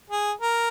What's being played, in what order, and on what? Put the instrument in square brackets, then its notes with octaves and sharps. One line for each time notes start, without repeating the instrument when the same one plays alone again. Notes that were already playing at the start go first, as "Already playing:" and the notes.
[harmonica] G#4
A#4